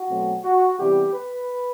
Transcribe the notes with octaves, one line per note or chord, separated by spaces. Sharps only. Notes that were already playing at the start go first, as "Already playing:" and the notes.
Already playing: F#4
B2 F#3 A3 C4
F#4
C3 E3 G3 B3 G4
B4